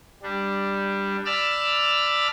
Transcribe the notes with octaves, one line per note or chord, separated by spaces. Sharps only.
G3 D4
D5 A5 B5 D6 E6 F6